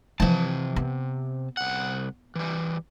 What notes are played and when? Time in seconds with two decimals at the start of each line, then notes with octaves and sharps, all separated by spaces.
0.20 C3 E3 F3 A5
0.76 B3
1.57 C2 F#5
2.35 E3 G3